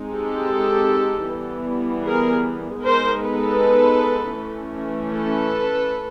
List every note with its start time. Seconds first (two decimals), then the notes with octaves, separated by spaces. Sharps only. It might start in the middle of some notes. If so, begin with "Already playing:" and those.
Already playing: G#3 C4 D#4
0.12 G4 A4
1.28 E3 G3 B3
2.04 G#4 A#4
2.81 G#3 B3 D#4 A#4 C5
3.20 A4 B4
4.36 E3 A3 C#4
5.13 A4 B4